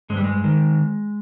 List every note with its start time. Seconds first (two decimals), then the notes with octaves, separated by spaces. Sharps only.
0.10 G2 G#3
0.17 G3
0.24 G#3
0.44 D#3